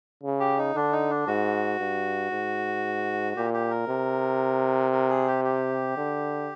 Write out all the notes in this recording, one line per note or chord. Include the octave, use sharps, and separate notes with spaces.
C#3
G4
D#4
D3 D4
D#4
D4
G#2 F#4
G2
G#2
A#2 G4
G4
A#4
C3
A#4
G#4
G4
G4
D3